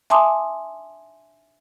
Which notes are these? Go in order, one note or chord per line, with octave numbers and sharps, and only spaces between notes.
E5 G#5 A5 C6 D6 D#6